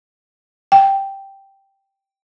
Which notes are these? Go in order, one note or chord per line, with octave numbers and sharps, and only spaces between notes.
G5